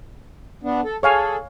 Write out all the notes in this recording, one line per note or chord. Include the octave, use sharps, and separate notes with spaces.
B3 D4
A4
G#4 A4 C#5 F5 G#5